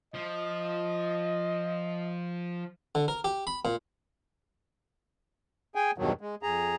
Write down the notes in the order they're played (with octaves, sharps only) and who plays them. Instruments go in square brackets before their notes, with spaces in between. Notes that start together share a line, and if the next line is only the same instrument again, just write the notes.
[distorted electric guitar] F3 [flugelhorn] D#5
[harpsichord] D3
A#4
G4
B5
A#2
[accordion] G#4 G5 G#5
E2 G2 B2 D#3 F#3
G#3
F2 G#4 A#5